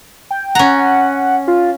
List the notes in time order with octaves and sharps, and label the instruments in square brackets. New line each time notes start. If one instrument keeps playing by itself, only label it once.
[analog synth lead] G5
[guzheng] C#4 A#5 [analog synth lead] F#5
[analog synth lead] F4